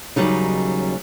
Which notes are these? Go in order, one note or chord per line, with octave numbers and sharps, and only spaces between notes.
D#2 C#3 F#3 G3 D#4